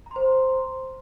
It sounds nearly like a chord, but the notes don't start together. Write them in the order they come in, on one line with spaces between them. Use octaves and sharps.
A#5 C6 C5